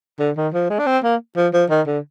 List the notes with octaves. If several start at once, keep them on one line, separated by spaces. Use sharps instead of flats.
D3
D#3
F3
G#3
D4
C4
A#3
F3
F3
D#3
D3